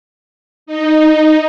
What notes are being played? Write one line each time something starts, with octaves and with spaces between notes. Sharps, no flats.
D#4